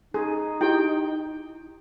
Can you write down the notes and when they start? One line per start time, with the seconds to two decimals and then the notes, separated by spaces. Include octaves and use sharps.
0.14 D#4 G#4
0.61 E4 G4 G5